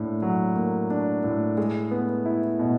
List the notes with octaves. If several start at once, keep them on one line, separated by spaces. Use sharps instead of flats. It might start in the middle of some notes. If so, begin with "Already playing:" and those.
Already playing: A2 A#3 D4
F#3
A#3
D4
A2
G#3
B3
E4
B2